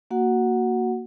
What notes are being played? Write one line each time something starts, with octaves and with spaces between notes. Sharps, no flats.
A#3 F#4 F#5